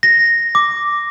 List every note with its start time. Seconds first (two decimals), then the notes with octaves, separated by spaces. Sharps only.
0.03 A#6
0.55 D6